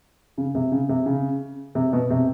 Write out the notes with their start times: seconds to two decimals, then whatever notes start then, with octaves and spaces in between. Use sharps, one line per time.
0.38 C#3
0.55 C3
0.72 C#3
0.89 C3
1.06 C#3
1.75 C3
1.93 B2
2.10 C3